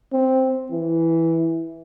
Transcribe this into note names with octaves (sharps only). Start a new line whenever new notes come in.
C4
E3